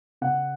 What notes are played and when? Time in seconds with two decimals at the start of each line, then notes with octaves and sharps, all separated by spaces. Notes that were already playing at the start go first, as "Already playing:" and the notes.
0.21 C#3 F#5